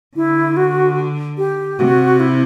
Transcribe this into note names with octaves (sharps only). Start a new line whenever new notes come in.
D3 E4
F#4
G4
C3 F#4
E4